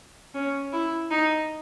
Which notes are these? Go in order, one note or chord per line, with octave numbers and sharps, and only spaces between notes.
C#4
E4
D#4